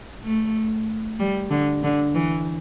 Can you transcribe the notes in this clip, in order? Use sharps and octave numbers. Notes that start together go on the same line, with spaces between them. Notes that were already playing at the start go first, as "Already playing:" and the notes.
A3
G3
D3
D3
E3